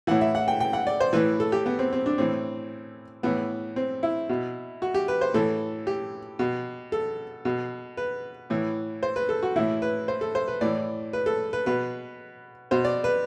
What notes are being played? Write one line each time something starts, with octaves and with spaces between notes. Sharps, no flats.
A2 E3 F#5
E5
F#5
G5
G5
F#5
D5
C5
A2 E3 B4
A4
G4
B3
C4
C4
D4
A2 E3 C4
A2 E3 B3
C4
E4
B2
F#4
G4
B4
C5
A2 E3 A4
G4
B2
A4
B2
B4
A2 E3
C5
B4
A4
F#4
A2 E3 E4
B4
C5
A4
C5
B4
A2 E3 D5
B4
A4
B4
B2 B4
B2 C5
D5
B4